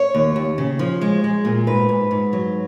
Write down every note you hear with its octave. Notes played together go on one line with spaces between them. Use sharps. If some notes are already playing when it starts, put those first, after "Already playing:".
Already playing: C#5
D#2
D#2
C#3
F3
G#3
G#3
A#2
G#2 B4
G#2
G#2
F#3